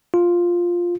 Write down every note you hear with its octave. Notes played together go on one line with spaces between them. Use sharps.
F4